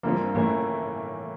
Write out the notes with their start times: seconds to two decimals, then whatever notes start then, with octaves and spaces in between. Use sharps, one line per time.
0.03 G2 E3 G3 A#3 C4 F4
0.35 A2 E3 A3 A#3 C#4 E4